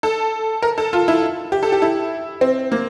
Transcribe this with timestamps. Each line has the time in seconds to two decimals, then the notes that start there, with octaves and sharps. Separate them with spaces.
0.03 A4
0.62 A#4
0.78 A4
0.93 F4
1.08 E4
1.52 G4
1.63 A4
1.72 G4
1.82 E4
2.41 C4
2.72 A#3